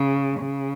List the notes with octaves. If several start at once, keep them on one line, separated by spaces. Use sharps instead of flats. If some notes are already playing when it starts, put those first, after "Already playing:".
Already playing: C#3
C#3